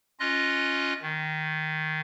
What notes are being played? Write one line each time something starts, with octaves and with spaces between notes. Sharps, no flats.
C#4 F4 D#5 F#6
D#3